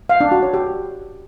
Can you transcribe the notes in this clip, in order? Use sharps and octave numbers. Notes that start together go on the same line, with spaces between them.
F5
D4
F#4
C#5
G4